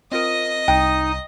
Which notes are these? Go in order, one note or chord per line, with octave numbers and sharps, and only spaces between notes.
C4 F4 A#4 D#5 D#6
C2 D#4 G5